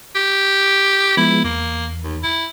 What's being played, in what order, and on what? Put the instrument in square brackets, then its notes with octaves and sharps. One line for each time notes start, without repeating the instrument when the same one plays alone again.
[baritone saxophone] G4
[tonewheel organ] F3 G#3 B3 [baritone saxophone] E4
[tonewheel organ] E2 [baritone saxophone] A#3
[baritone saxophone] D#2
E4